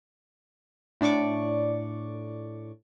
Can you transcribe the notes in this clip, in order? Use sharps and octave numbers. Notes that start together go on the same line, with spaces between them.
A2 D4 D5 C#6 D6